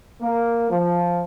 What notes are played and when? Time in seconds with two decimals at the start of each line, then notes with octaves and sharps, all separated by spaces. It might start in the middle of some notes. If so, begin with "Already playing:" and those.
0.21 A#3
0.70 F3